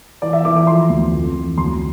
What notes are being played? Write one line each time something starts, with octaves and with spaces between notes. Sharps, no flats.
E3 D5
E5
E3 D6
D6
F3 C6
D2
F2
E3
D2 C6